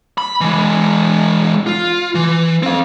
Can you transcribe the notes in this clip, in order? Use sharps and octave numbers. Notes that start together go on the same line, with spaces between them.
B5
E3 G#3
F4
E3
C4 F5